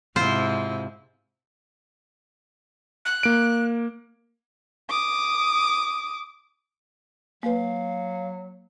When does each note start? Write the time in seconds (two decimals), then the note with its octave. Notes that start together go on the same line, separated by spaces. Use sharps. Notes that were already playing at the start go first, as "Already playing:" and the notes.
0.16 G#2 C3 E4 F4 C5
3.05 F#6
3.23 A#3 D7
4.90 D6 D#6
7.43 F#3 A#3 B4 F5